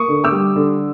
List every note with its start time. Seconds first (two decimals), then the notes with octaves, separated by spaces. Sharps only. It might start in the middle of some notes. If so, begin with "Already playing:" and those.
Already playing: A#3 C#6 D#6
0.08 D3
0.24 D6 E6
0.32 G3
0.56 D3